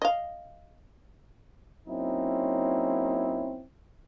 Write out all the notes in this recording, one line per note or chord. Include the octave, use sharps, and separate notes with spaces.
D#5 F5
F#3 A#3 C4 C#4 D#4 E4